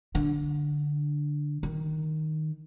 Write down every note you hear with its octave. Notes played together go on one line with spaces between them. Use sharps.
D3
D#3